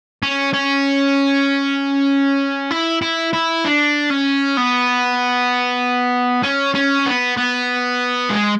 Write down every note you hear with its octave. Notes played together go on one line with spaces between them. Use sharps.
C#4
C#4
E4
E4
E4
D4
C#4
B3
C#4
C#4
B3
B3
G#3